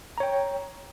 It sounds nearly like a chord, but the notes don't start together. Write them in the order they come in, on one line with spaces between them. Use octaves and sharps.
A#5 C#5 G5